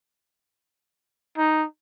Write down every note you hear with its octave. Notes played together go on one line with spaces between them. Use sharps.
D#4